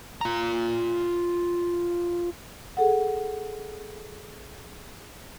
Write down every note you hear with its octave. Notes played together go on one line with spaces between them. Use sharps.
F4 A#5
G#4 A4 F#5